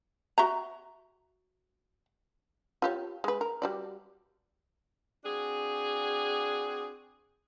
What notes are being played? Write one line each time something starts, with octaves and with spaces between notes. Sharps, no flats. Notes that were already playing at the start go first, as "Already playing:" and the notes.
F#4 E5 A#5
F4 G4 C#5
G#3 B4
A#4
G3 F#4 D5
C4 D4 F#4 G#4